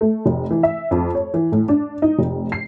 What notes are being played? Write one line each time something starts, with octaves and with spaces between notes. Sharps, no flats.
A3
F1
E3
E5
F2
C#5
E3
A2
D4
D#4
F1
C7